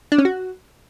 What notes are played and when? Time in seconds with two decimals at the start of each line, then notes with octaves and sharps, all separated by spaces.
0.12 D4
0.18 C#4
0.25 F#4